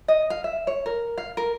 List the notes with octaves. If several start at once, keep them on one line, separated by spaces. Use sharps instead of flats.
D#5
F5
E5
C#5
A#4
F5
A#4